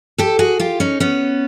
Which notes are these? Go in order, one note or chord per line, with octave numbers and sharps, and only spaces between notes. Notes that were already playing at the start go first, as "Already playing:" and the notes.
G4 A4
F#4 G#4
F4 G4
C#4 D#4
B3 C#4